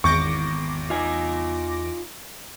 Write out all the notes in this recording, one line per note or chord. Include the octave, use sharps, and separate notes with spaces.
G#1 E2 C#6 D6 G6 A#6 C#7
D#4 F4 G#5